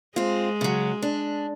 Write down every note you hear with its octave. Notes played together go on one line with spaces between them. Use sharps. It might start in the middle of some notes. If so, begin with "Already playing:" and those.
G#3 C4 F4
C#3 F#3
D4